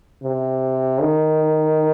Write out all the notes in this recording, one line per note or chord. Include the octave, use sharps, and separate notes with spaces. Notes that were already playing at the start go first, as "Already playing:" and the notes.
C3
D#3